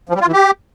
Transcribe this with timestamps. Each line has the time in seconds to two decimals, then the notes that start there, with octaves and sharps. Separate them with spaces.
0.09 F3
0.15 G3
0.21 F4
0.27 E3
0.33 G4